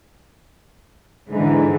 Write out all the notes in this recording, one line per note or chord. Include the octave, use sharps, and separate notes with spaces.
G#2 D3 E3